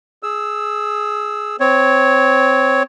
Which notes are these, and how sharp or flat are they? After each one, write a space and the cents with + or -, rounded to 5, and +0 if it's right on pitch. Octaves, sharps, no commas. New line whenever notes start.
G#4 +10 E6 +0
C4 -10 C#5 +0